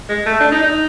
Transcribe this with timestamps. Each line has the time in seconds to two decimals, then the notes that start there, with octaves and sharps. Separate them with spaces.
0.09 G#3
0.26 A3
0.40 D4
0.52 D#4
0.62 D#4